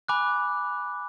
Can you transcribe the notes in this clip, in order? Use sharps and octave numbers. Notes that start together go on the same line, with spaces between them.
G#5 B5 D6 F#6